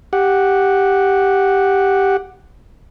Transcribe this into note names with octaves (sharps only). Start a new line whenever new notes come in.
G4 F#5